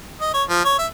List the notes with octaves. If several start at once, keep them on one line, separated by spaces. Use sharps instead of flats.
D#5
C#5
F3
C#5
E5